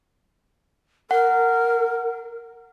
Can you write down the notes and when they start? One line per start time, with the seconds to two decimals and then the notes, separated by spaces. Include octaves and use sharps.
1.11 A#4 F#5